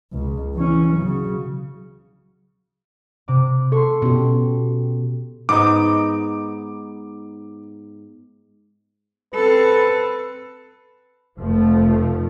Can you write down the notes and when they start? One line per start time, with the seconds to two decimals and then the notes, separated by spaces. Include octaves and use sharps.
0.13 C#2
0.54 E3 C#4
0.93 C#3 F#3
3.28 C3 D6
3.72 A4 C6 C#6
4.02 B2 C#4 G4
5.49 G#2 B3 D#4 D6
9.35 C4 A4 B4
11.38 F1 F3 A3